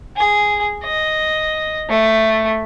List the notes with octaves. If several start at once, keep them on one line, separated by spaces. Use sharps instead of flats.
G#4
D#5
A3